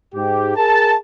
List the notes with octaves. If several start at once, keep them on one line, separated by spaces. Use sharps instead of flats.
G#2 G4
G#4 A#4 A5